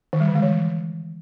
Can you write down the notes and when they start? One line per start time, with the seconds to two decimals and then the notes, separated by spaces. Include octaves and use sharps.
0.13 D#3
0.20 G3
0.28 D3
0.35 G#3
0.42 E3